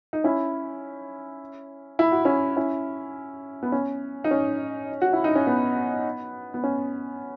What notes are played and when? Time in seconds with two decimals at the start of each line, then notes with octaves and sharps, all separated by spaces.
0.13 D#4
0.24 C#4 E4
1.99 E4
2.12 F#4
2.25 C#4 E4
2.57 C#4 E4
3.63 B3
3.72 C#4
4.24 D#4
4.31 C#4
5.02 F#4
5.13 E4
5.24 D#4
5.35 C#4
5.47 B3
6.54 B3
6.64 C#4